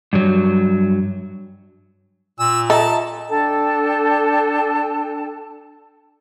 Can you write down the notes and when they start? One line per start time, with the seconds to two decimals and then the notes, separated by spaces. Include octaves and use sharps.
0.13 G2 F#3
2.40 A#2 E6
2.70 A4 D#5 E5 A5 A#5
3.29 D4 A4 G5 A5